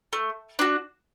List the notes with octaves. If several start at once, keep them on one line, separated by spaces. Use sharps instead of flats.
A3
D4 F#4